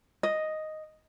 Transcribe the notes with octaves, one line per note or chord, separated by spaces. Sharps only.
D#5